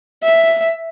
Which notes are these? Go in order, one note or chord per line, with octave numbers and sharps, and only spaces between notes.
E5